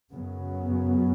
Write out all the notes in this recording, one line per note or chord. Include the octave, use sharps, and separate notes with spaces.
F#2 C#3 F#3 B3